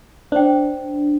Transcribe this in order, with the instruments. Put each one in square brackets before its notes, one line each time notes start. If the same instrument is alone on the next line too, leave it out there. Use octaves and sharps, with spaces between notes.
[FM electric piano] D4 [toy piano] C5 G5